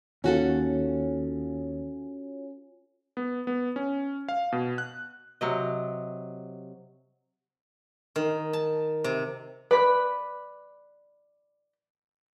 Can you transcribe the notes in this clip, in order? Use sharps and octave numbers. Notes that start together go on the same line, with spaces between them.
D#2 C#4 F4 F#4 A4 C#5 G#5
B3
B3
C#4
F5
B2
F#6
C3 F#3 D#5
D#3
A5
C3
B4 D5 B5 F#6